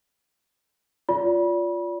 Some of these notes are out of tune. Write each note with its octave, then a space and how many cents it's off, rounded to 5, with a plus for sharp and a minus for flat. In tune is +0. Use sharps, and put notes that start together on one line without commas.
F4 +0 D5 -30 B5 -35